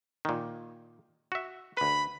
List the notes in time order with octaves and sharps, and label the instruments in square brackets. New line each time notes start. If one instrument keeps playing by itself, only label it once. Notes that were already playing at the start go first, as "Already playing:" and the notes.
[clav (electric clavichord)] A#2 D#3
F#4 E5
[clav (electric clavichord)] D2 B4 [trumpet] B5